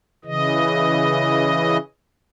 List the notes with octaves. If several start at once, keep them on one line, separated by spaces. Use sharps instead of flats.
C#3 E3 D#5